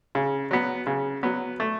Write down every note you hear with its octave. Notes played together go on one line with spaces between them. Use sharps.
C#3
F#3 B3
C#3
F#3 B3
A3